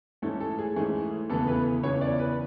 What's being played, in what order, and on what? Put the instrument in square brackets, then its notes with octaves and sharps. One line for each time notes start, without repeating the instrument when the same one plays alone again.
[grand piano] G#2 E3 A3 C#4 A4
A4
G#4
G#2 E3 A3 C#4 G#4
E2 C#3 E3 B3 A4
B4
E2 C#3 E3 B3 C#5
D5
B4